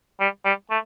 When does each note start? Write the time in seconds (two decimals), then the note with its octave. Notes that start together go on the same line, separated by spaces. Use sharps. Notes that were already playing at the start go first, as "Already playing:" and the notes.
0.20 G3
0.45 G3
0.70 A3